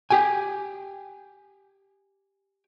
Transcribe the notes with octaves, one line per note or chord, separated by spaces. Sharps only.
G4 G5 G#5